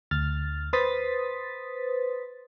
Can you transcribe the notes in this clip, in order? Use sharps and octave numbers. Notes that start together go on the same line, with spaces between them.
D2 F6 A6
B4 C5 C6 D#6 A6 B6